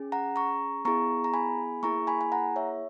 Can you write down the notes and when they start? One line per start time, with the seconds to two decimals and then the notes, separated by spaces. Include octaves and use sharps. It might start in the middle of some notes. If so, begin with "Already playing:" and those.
Already playing: C#4 G#4
0.12 F#5 A#5
0.36 A#5 C#6
0.85 B3 E4 G#4 A#5 C#6
1.24 A#5
1.34 G#5 B5
1.83 A#3 E4 G#4 A#5 C#6
2.07 G#5 B5
2.21 G#5
2.32 F#5 A#5
2.56 C#5 E5